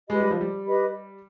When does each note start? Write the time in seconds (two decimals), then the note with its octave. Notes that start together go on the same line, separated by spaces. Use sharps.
0.09 G#3 G4 B4 D#5 B5
0.20 G3
0.31 F3
0.41 G3
0.65 G4 B4 D#5 B5